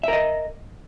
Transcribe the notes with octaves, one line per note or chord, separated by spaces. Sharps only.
A#4 D#5 E5